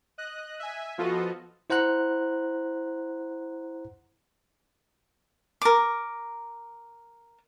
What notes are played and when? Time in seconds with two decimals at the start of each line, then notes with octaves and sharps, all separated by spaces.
0.18 D#5 F#6
0.60 E5 G#5
0.98 F3 B3 F4 F#4 A4 D#5
1.70 E4 C5 F#5 A#5 F#6
5.61 A#4 D6